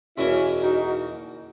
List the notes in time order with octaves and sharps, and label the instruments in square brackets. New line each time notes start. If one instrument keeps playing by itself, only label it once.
[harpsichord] E2 B2 A#3 [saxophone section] C#4 E4
[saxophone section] D#4 F#4